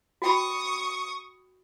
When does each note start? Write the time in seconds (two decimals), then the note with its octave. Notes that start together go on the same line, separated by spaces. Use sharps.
0.22 F#4 G5 B5 C#6 D#6